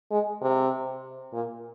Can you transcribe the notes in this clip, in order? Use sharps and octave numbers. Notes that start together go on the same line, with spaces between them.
G#3
C3
A#2